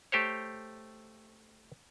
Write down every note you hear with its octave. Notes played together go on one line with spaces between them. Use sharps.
A3 G4 C5 C#5